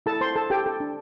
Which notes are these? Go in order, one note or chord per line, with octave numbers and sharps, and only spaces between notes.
E4 A4 A5
C5 C6
A4 A5
G4 A4 G5
A4
D4